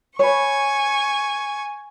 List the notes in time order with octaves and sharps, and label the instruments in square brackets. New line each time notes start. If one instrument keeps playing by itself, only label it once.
[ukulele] B4 C#5 [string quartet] G#5 C#6